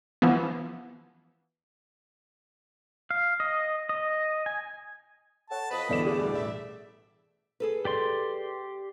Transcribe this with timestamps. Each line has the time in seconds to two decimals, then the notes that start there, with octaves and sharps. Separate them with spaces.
0.22 E3 F3 B3
3.11 F5
3.40 D#5
3.89 D#5
4.46 G#5
5.50 A4 C#5 F#5 A5
5.71 F2 B4 D#5 B5
5.89 E2 B2 D3 E3 G3 D5 E7
6.07 A3 G#4 D5
6.32 A1 E5
7.60 G#4 A4 B4
7.85 G4 D5 C6